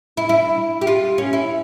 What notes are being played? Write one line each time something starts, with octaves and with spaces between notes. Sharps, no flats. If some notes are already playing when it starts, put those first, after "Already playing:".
E4
E4
G4
F4
C#4
E4